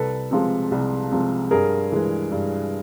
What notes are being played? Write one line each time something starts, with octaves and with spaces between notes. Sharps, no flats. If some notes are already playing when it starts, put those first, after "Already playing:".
Already playing: C2 A4 B4
C3 F3 G#3
C2
C3 F3 G#3
G2 G#4 A#4
E3 G#3
G2